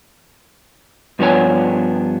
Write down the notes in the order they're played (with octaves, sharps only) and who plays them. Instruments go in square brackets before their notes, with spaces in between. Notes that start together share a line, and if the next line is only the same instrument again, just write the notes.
[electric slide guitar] G2 F3 B3 D4 C#5 G#5